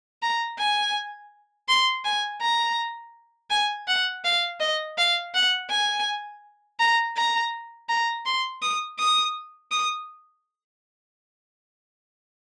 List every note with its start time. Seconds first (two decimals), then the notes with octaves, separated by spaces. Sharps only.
0.22 A#5
0.59 G#5
1.68 C6
2.05 G#5
2.41 A#5
3.50 G#5
3.88 F#5
4.25 F5
4.60 D#5
4.98 F5
5.34 F#5
5.70 G#5
6.80 A#5
7.17 A#5
7.89 A#5
8.26 C6
8.62 D#6
8.99 D#6
9.72 D#6